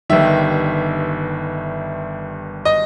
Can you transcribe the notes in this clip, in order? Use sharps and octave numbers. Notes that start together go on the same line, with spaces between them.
G1 G2 D#3 E5
D#5